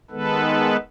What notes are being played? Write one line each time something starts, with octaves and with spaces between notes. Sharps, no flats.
D#3 G#3 B3 A4 B4